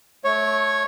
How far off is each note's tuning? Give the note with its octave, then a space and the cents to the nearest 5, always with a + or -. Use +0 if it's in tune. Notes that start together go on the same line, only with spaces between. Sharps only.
A3 -20 C#5 -5